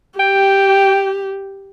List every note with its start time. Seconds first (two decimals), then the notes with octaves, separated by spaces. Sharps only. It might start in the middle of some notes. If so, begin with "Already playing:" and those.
0.20 G4 G5